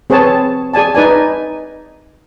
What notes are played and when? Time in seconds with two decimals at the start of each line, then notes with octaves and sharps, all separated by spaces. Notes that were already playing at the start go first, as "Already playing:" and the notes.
0.10 C4 G#4 B4 C#5 A5
0.74 G#4 D5 G#5 A5
0.95 D#4 B4 D5 G#5